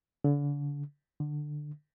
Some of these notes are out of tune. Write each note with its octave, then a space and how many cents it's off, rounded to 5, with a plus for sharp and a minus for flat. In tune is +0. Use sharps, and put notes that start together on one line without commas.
D3 -35
D3 +15